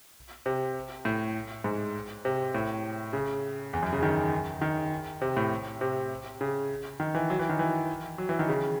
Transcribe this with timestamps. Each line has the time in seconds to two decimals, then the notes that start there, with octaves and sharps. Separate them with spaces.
0.46 C3
1.05 A2
1.64 G#2
2.25 C3
2.55 A2
3.13 C#3
3.73 E2
3.83 F#2
3.93 C#3
4.03 D#3
4.61 D#3
5.21 C3
5.37 A2
5.81 C3
6.41 C#3
7.00 D#3
7.15 E3
7.30 F#3
7.39 E3
7.49 D#3
7.59 E3
8.18 F#3
8.29 E3
8.39 D#3
8.49 C#3